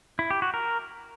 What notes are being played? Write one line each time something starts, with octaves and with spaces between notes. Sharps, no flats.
E4
G4
F#4
A#4